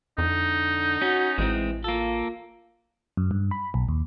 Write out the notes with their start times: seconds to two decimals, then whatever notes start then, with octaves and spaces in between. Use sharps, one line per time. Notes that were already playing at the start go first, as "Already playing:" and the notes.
0.18 F2 D3 D#4
1.02 C#4 F#4
1.38 A1 E3 G#3 C4
1.84 A#3 F4 A4
3.17 F#2
3.31 G2
3.51 B5
3.74 B1
3.88 D#2